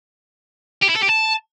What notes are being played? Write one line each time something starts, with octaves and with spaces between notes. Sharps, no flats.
G4
E4
A4
G4
A5